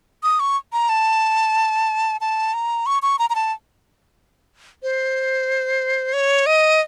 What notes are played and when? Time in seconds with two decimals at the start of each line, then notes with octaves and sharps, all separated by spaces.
0.23 D#6
0.40 C#6
0.73 A#5
0.89 A5
2.21 A5
2.54 A#5
2.86 C#6
3.02 C#6
3.19 A#5
3.30 A#5
3.35 A5
4.83 C5
6.13 C#5
6.46 D#5